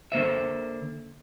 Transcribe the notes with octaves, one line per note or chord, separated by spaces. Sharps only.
D3 A#3 C5 E5